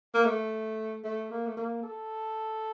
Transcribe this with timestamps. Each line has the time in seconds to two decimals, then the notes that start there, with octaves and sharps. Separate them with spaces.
0.14 A#3
0.25 A3
1.04 A3
1.31 A#3
1.47 A3
1.57 A#3
1.83 A4